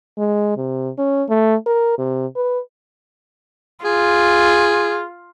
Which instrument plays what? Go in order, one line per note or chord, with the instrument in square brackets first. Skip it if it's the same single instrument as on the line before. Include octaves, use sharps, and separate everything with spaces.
[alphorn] G#3
C3
C#4
A3
A#4
C3
B4
[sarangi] F4 [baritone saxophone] G#4